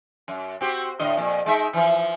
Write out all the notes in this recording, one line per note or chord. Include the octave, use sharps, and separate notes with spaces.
F#2
C4 F#4 G4
A2 D3 D#5
F2 A#2
G#3 D#4 E5
E3 F3